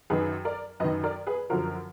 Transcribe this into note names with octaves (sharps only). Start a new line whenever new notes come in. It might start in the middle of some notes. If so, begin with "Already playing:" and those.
F#2 D#3 G#4 B4
A#4 D5
F#2 D#3 B4 D#5
A#4 D5
G#4 B4
F#2 D3 F3 F#4 A#4